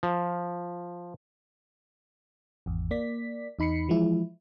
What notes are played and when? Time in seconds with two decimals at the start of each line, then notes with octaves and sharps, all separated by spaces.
0.03 F3
2.66 G#1 E2
2.91 A#3 D5 B6
3.59 E2 D#4 B5 C7 C#7
3.88 E3 F3 G#3 E4